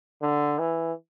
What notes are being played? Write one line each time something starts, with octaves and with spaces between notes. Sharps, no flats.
D3
E3